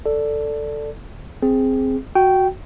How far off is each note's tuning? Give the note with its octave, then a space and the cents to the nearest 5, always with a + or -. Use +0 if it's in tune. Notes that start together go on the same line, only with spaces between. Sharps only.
A4 +10 D5 +0
C4 +0 G#4 +0
F#4 +0 G5 -15